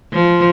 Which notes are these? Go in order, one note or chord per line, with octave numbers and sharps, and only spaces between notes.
F3